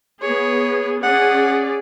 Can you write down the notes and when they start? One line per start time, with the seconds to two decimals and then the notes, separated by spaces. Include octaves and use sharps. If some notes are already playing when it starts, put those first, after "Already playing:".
0.22 B3 G#4 C#5
1.03 C#4 G#4 D5 F#5